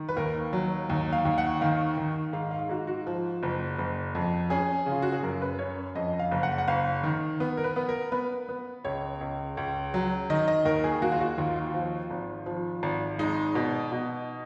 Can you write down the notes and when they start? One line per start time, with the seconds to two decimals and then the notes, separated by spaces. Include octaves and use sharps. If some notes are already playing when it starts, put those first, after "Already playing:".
Already playing: D#3
0.09 B4
0.17 D#2 A#4
0.53 F#3
0.90 D#2
1.13 F5
1.25 D#2
1.38 F#5
1.61 D#3 F5
1.98 D#3
2.33 G#2 F5
2.51 F5
2.69 G#2 F#4
2.87 F#4
3.07 F3
3.43 F#1
3.78 F#1
4.15 F2
4.50 C#4 G#4
4.86 C#3
4.92 F4
5.02 F#4
5.13 G#4
5.23 F#2 A#4
5.42 B4
5.59 C#4 C#5
5.95 F2 D#5
6.19 F5
6.31 F#1
6.43 F#5
6.58 F#5
6.68 F#1 F5
7.04 D#3
7.40 B3
7.57 A#4
7.64 B4
7.76 B3
7.89 A#4
8.12 B3 B4
8.49 B3
8.85 C#2 C#5
9.21 C#2
9.57 C#2
9.94 F#3
10.30 D#3 D#5
10.48 D#5
10.65 D#2 A#4
10.84 G#4
11.02 A#3 F#4
11.12 F4
11.20 F#4
11.38 D#2 F4
11.56 F4
11.74 F3
12.11 G#1
12.46 F3
12.83 G#1
13.19 G#3 D#4
13.55 B2
13.92 B2